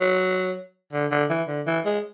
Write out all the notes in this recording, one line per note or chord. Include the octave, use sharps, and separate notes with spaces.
F#3
D3
D3
E3
D3
E3
G#3